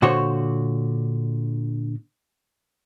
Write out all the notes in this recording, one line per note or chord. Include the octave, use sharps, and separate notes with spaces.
A#2 D3 F#4 C5 C#5